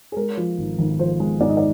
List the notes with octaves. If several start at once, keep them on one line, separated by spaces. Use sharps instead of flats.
G#4
G#3 A#4
F3
G#1
G#1
F3 C5
G#3
G#2 D5
D#5
D5